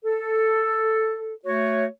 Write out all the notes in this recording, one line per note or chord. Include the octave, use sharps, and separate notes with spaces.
A4
A3 F#4 C#5